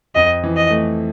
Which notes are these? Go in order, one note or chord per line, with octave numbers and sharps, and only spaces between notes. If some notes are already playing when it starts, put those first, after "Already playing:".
F2 D#5
E3
D#5
A3